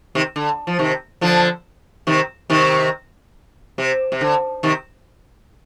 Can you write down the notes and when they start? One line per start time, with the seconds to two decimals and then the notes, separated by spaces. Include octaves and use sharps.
0.15 C3 D#3
0.36 D3
0.67 F3
0.79 C3 D#3
1.21 D3 F3
2.07 C3 D#3
2.50 C3 D#3
3.78 C3
4.12 C3
4.21 D3
4.63 C3 D#3